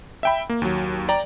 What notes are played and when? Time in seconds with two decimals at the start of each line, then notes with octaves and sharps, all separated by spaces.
0.23 E5 G5 B5
0.49 A#3
0.62 D#2 F#3
1.09 D5 G5 A#5